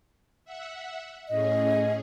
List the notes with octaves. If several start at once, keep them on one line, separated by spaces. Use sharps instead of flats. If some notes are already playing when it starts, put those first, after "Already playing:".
E5 F#5
A2 C#4 G#4 D#5